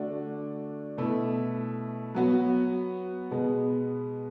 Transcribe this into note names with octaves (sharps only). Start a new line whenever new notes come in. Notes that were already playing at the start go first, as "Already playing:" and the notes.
Already playing: D3 A3 D4 F#4
B2 A3 E4
F#3 B3 F#4
B2 G#3 B3